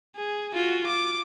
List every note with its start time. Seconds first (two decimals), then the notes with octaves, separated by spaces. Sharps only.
0.16 G#4
0.54 F4 F#4
0.86 D6